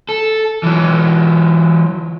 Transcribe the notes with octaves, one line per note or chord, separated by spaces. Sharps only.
A4
E3 F#3